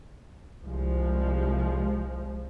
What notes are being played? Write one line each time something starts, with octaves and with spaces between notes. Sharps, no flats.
C2 F3 G#3